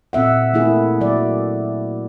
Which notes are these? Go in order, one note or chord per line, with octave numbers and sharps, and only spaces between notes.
A#2 C4 E5 F#5
A3 A#3 E4 G#4
F#3 D5